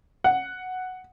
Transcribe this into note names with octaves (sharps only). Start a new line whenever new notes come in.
F#5